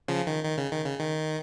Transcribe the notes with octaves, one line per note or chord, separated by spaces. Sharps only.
C#3 F3
D#3
D#3
C#3
D#3
C#3
D#3